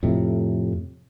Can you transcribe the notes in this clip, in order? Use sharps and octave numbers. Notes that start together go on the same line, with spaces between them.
F2 A2 C3